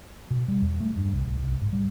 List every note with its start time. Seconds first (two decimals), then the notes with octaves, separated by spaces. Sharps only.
0.31 B2
0.48 G3
0.62 E2
0.80 A3
0.97 G2
1.13 C2
1.26 B1
1.38 C2
1.61 G#2
1.73 G3